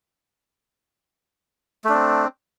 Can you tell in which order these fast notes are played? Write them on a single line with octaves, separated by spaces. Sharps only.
A3 D4 C4